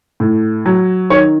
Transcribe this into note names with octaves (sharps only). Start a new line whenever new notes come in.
A2
F#3
D#3 C#5